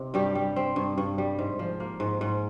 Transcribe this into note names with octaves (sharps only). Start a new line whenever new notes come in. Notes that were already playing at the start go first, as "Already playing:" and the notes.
Already playing: C3 D#4
G2 G3 G4
G3
C4
G2
G2
G3
G#2
F3
A#3
G#2
G#2